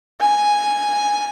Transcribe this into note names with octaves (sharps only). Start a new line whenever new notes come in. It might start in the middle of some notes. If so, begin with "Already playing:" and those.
G#5